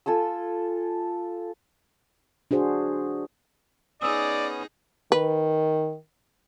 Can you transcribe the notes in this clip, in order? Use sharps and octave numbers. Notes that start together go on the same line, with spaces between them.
F4 A4 G#5 E6
D4 F#4 G#4 C5
B3 C#4 D#4 G#4 D5 D#6 E6
D#3 B4